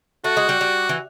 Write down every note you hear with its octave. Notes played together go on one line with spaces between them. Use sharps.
A3 F#4
G#3
G3
G3
E3